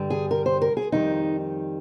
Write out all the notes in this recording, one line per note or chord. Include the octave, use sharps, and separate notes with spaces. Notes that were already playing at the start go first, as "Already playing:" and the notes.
Already playing: G2 D3 G3
G#4
A#4
C5
A#4
G#4
F2 D#3 G3 D#4